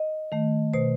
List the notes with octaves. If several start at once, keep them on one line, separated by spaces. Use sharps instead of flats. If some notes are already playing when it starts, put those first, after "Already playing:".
Already playing: D#5
D#3 A3
B2 C5